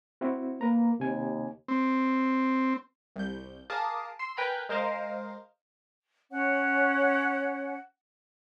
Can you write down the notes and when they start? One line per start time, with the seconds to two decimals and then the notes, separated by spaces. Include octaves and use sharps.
0.21 C4 E4 F#4
0.61 A#3 B4 A#5
1.00 D#2 C3 G#5
1.68 C4
3.16 C2 G6
3.70 G#4 A#4 F5 A5 D6 D#6
4.19 C6 E6
4.37 A#4 B4 G5 G#5 A#5 B5
4.69 G#3 A#4 C5 D#5 F5
6.31 C#4 C#5 F#5